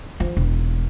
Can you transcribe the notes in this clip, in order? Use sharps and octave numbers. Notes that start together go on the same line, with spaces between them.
F3
E1